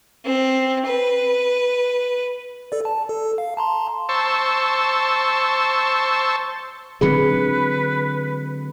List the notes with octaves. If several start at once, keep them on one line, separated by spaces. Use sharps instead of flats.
C4
B4
A4 D5
A5
A4
F5
A5 A#5 C6
C5 A5 C#6 E6
D3 F#3 G#3 C4 G#4 B4 B5 C#7